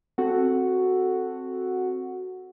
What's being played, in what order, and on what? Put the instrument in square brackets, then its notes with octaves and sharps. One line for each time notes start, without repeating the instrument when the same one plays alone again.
[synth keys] C4 F#4 A4 F#5